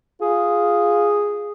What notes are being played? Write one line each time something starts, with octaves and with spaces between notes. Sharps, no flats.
F4 G#4